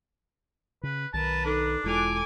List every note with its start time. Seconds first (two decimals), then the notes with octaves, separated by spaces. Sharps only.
0.83 C#3 B4
1.13 B1 D#3 A#4 B4 A5
1.45 D4 D#4 A4
1.84 E1 G#3 E4 F4 A4 G#5 D6 F7